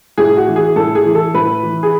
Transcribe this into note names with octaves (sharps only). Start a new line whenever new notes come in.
A2 G#4
F#4
E3
G#4
A2 A4
G#4
E3
A4
A2 B4
E3
G#4